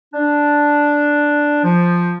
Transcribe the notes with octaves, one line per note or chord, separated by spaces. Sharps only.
D4
F3